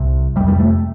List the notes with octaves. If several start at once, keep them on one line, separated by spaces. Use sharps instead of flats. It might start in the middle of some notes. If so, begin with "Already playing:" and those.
Already playing: C2 C3
F2 C3 G3
G3
A3